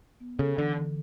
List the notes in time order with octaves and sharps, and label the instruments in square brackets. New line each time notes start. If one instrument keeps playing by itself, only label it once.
[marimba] B3
[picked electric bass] C#3 [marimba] A4
[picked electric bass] D3 [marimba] E3
[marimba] D3